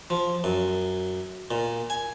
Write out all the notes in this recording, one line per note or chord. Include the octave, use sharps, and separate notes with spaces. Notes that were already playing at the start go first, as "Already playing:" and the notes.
F3
F#2
A#2
G#5